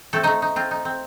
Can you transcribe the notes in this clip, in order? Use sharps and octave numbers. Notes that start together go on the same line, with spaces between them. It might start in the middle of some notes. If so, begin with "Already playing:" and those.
A3 C4 A4
A3 D#4 D#5
D#4
C4 F4
D#4
C4